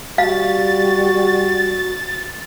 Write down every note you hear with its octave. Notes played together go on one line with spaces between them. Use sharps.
G3 F#4 F5 A6